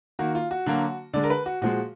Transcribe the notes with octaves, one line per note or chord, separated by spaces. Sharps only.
D#3 A#3 F#4
F4
F#4
D3 F#3 A#3
D3 G#3 D5
A#4
B4
F#4
A#2 F3 G#3 F#4